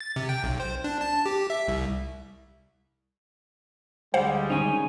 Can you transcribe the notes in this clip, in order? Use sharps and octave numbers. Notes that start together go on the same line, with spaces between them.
A6
C3
G5
B1
C5
D4
A5
G4
E5
C2
D2 G3 G#3 C5 F5 F#5
D#3 C#4 D#4 G#5